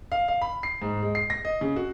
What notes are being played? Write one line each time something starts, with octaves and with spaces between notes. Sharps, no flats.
F5
F5
B5
C7
G#2
G#3
C7
A#6
D#5
C#3
F#4